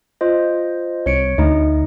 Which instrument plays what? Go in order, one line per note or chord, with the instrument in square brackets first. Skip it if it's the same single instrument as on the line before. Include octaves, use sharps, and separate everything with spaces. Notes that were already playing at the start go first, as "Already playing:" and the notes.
[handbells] F4 C5 D#5
[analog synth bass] C2 [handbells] C#5 C#7 D7
[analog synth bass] D2 [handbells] A3 D#4 D#5